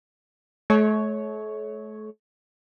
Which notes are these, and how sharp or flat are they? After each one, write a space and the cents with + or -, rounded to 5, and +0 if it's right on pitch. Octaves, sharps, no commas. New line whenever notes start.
A3 -40 C#5 +0